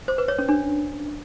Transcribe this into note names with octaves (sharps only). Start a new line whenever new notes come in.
C5
B4
C#5
C#4
D4